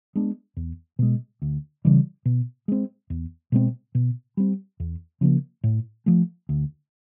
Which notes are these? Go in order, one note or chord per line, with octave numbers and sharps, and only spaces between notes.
G#3 B3 D4
E2
B2 G#3
D2
C#3 E3 G3
B2
G#3 C4
E2
B2 G#3 C4
B2
G3 C4
E2
C#3 F3 A#3
A2
F3 A3
D2